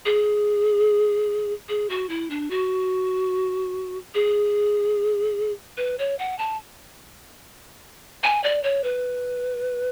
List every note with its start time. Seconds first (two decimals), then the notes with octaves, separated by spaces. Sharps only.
0.05 G#4
1.69 G#4
1.90 F#4
2.09 E4
2.30 D4
2.50 F#4
4.14 G#4
5.77 B4
5.99 C#5
6.19 F#5
6.38 A5
8.23 G#5
8.44 D5
8.63 C#5
8.84 B4